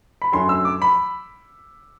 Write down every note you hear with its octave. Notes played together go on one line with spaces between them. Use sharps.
B5
F#2 D3 F#3 C6
E6
D6
B5